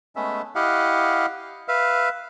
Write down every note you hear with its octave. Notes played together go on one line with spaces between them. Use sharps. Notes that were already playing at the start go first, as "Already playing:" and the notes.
G#3 A3 B3 C#4 E5
E4 G4 D#5 F5 F#5
B4 E5 F5